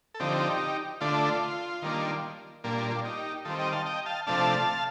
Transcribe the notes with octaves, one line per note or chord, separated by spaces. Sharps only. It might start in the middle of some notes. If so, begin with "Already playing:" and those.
A4
D3 F3 C4 D#4 G4
D3 A3 D4 F4
D#3 G3 A#3 D4
A#2 G3 A#3 D4
D4 F4
D4 F4
D#4 G4
D#3 G3 C4 F4 A4
D#5 G5
F5 A5
D#5 G5
F5 A5
C3 F3 A3 D4 F5 A5